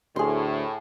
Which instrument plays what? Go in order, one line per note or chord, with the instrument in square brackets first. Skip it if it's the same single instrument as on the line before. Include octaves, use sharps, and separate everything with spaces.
[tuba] D2 [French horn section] A2 [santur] G#4 C6